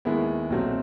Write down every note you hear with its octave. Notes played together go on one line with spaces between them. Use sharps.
D#2 D#3 G#3 B3 E4
B1 A#2 F#3 A3 C4